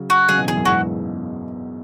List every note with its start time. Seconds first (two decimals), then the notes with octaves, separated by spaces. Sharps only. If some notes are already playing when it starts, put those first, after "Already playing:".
Already playing: C#3 F#3
0.10 F#4
0.29 C#3 F#3 G#4
0.38 B2 E3
0.47 E2 G#4
0.57 F#2
0.65 E2 G#2 F#4